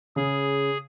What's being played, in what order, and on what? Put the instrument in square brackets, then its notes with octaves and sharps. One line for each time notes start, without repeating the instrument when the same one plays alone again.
[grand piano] C#3 [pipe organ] G#4